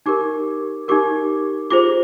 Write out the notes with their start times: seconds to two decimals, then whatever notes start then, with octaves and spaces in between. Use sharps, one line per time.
0.06 D#4 G4 A#4 D6
0.88 D#4 G4 A#4 D6
1.71 F4 G#4 C5 D6